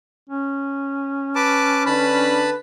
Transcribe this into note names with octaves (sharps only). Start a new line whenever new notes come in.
C#4
B4 A5 D6
D3 D4 B4 A5 B5